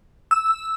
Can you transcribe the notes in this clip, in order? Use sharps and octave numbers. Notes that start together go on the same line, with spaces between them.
E6